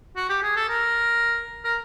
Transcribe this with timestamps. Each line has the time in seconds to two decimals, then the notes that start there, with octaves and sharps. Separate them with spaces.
0.16 F#4
0.29 G4
0.43 G#4
0.56 A4
0.69 A#4
1.65 A#4